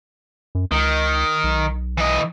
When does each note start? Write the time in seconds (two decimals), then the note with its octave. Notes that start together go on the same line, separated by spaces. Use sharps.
0.55 F#2
0.71 C#2 D#3
1.44 B1
1.98 E3 D#5